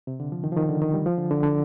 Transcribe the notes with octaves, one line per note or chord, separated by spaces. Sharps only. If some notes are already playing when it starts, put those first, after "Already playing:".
C3
D3
F3
D#3
F3
D#3
D3
D#3
G3
F3
D3
D3
D3